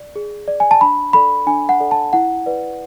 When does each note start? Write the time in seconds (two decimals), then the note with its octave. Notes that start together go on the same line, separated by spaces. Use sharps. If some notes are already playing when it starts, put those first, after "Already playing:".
Already playing: D5
0.16 G#4
0.48 D5
0.60 G#5
0.71 A5
0.81 D4 B5
1.13 A4 D5 B5
1.47 D4 G#5
1.69 F#5
1.80 A4 D5
1.91 A5
2.13 E4 F#5
2.46 B4 D5